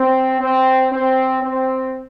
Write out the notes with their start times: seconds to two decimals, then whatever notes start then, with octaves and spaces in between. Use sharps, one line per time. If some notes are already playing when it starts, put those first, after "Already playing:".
Already playing: C4
0.41 C4
0.92 C4
1.43 C4